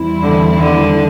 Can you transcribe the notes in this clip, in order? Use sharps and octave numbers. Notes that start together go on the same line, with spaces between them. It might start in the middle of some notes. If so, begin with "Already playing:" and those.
Already playing: E2 E3 G3 C4 E4
D3
D3